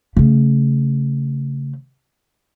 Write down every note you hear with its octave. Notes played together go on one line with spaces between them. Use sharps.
C#3 A3